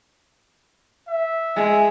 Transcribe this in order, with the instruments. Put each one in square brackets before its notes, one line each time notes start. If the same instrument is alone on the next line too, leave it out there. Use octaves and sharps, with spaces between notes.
[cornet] E5
[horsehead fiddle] G#3